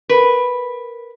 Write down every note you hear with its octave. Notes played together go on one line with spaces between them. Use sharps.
A#4 B4